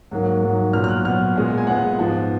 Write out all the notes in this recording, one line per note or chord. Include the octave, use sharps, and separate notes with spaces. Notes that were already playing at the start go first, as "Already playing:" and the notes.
G#2 F#3 A#3
G#2 F#3 A#3
A#2 F#3 B3 F6
F6
F#6
A#2 F#3 B3 F6
A#2 G#3 B3
G#5
A#2 G#3 B3 F#5
G#2 F3 B3